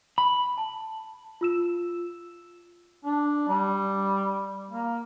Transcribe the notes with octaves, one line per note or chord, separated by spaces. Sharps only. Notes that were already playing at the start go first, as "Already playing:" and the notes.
B5
A5
F4 E6 E7
D4
G3
A#3